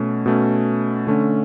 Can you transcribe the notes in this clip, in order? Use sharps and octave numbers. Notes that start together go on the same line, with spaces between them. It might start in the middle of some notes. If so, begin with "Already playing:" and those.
Already playing: B2 A3 C#4
B2 A3 C#4
D3 A3 C#4